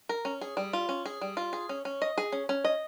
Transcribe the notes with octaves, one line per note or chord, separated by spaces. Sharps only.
A#4
C#4
G#4
G3
F4
C#4
G#4
G3
F4
G#4
C#4
C#4
D#5
G#4
C#4
C#4
D#5